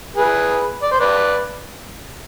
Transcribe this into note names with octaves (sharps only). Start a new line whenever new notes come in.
G#4 B4
D5
C5
B4 D5